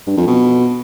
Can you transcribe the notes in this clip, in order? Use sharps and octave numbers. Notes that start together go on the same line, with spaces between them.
G2
F2
B2